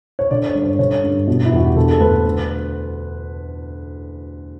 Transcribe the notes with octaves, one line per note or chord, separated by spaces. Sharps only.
C#5
D3 D5
C#5
G2
C#5
D3 C#5
G2
B2
E4
E2 F#4
G4
D3 A4
A4
D2 B4
D3